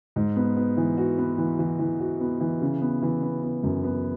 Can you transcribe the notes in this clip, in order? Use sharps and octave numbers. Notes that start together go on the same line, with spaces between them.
G#2
B3
B3
E3
F#4
B3
E3
E3
E3
F#4
B3
E3
C#3
B3
E3
B3
B3
F#2
B3